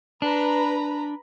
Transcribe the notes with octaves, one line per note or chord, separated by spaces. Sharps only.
D4 B4 A#5 B5